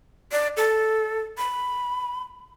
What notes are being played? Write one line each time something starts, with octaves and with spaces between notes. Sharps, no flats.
D5
A4
B5